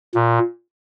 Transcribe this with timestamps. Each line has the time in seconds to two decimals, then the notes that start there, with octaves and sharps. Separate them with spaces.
0.15 A#2